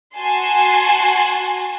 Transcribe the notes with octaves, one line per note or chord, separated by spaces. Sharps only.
F#4 G#5 A5 C6